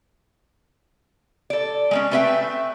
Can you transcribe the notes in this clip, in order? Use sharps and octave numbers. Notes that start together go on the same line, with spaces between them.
A4 D5
G#3 A#3 C#4
A3 C4 B4 D#5 E5 G5